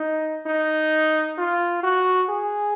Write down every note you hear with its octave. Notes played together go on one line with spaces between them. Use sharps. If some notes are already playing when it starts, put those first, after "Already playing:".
Already playing: D#4
D#4
F4
F#4
G#4